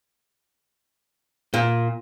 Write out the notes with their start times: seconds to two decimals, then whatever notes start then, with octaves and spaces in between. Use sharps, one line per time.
1.54 A#2